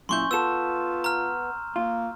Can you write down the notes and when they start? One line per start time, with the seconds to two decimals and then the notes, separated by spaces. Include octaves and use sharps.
0.09 F#2 A#2 C#4 E4 C6 C#6 G6
0.31 B3 F4 A4 E6 E7
1.04 A#5 F6
1.76 A#3 F4